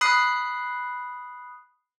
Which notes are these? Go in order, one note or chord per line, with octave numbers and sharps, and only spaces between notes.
B5 D#6 F#6 C7